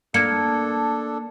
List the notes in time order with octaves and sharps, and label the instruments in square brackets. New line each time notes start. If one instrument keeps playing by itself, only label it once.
[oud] A#3 [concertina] D4 A4 [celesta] G#6 C#7